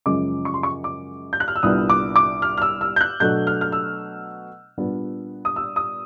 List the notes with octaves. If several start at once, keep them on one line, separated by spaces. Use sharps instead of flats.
F#2 C#3 F3 G#3 C#4 D6
C#6
C6
C#6
D6
G6
F#6
F6
E6
C2 A#2 G3 B3 D4 D#6
D6
D6
F6
F6
E6
E6
G6
F#6
B2 F#3 A3 D4 G6
F6
F6
E6
A#2 G3 B3 D4
D#6
E6
D#6